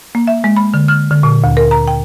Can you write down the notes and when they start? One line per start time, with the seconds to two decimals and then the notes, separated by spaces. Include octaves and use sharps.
0.15 A#3
0.27 E5
0.44 G#3
0.57 B5
0.74 D3
0.88 F6
1.11 D3
1.23 A#2
1.44 D2
1.57 A#4
1.71 A#5
1.88 G5